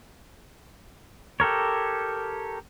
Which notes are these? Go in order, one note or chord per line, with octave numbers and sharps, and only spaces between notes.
G4 A4 A#4 C#5